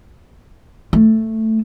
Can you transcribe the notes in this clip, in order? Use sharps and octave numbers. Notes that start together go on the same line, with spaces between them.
A3